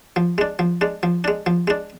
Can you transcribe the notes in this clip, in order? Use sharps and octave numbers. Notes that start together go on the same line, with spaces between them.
F3
G#3 D4
F3
G#3 D4
F3
G#3 D4
F3
G#3 D4